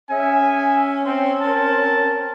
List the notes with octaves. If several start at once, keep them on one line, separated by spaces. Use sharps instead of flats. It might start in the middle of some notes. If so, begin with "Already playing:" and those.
C#4 G#4 E5 G#5
C4
C4 A#4 A5